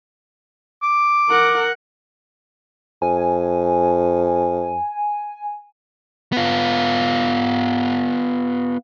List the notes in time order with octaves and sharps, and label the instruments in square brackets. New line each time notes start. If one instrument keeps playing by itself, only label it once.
[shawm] D6
[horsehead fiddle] A#4 F#5
[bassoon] F2 [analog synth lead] G#5
[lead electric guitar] B3 F4